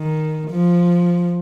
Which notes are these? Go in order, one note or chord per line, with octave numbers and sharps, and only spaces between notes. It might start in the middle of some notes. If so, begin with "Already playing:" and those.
Already playing: D#3
F3